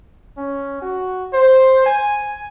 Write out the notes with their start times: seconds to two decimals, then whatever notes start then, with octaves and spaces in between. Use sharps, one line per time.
0.37 C#4
0.82 F#4
1.33 C5
1.85 G#5